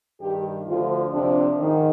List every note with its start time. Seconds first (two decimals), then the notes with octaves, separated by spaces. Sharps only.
0.22 G2 D#3 G4
0.68 D2 D3 F3 F4
1.13 F2 C3 F3 D4
1.59 G#2 D#3